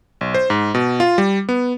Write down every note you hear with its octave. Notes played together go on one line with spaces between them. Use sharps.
B1
C5
G#2
B2
F4
G3
B3